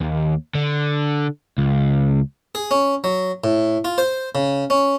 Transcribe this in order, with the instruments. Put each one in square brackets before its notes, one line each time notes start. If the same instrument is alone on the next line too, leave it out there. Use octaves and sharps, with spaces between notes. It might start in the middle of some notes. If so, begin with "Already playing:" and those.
[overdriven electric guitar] D#2
D3
C#2
[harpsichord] G#4
C#4
F#3
A2
F4
C5
C#3
C#4